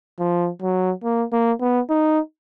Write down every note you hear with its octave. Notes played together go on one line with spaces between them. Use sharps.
F3
F#3
A#3
A#3
B3
D#4